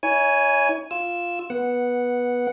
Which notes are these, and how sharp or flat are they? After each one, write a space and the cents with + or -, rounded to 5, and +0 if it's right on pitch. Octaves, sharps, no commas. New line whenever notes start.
E4 -40 C#5 +25 G#5 +0
F4 +0 E6 +0
B3 -15 F#5 +0